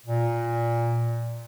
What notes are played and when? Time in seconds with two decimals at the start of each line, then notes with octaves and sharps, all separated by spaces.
0.06 A#2